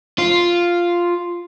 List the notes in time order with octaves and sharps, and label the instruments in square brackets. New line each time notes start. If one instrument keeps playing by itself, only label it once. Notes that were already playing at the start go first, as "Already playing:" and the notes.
[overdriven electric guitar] F4